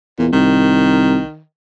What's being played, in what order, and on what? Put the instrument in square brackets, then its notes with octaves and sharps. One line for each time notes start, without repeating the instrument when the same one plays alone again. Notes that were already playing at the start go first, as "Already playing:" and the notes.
[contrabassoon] E2 [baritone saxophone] A#2
[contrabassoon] C2 [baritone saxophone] D#3